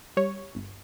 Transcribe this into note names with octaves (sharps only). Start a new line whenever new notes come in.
G3 C#5
G1